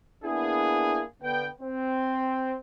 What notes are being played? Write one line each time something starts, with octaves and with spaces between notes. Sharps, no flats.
A#3 B3 D4 E4 G#4
D3 B3 G5
C4